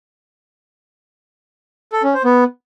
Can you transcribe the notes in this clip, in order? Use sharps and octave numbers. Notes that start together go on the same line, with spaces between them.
A4
C#4
C5
B3